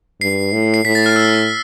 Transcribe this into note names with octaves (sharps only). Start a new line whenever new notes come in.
G2 C7
A2
C7
A2 B6
A6
F6
E6